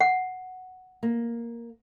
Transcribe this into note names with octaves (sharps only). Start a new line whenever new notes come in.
F#5
A#3